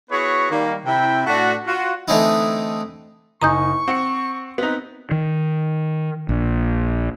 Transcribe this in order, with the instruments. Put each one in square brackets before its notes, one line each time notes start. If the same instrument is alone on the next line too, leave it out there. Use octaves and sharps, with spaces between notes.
[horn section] B3 E4 F#4 G#4 B4 C#5
D#3 G3 A#3
C3 E4 G5
A2 A3 D4 F#4
F4 F#4
[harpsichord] D3 E3 A3 C4 D#4 E4
[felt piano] F#1 D#4 G#5 [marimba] A#5 D#6 G6 [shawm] C#6
[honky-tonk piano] C4 [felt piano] F#5 C#7
[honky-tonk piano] B3 D#4 [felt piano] C4 [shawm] B4
[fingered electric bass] D#3
A#1